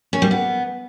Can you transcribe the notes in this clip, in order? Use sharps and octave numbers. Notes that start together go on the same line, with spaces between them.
C#4
G3
B3